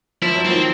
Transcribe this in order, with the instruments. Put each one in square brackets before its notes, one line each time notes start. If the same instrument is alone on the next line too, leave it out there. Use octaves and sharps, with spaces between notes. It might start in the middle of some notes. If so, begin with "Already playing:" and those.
[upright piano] F3 [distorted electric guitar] E4
[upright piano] F#3
[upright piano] D#3 F3 [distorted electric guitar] C4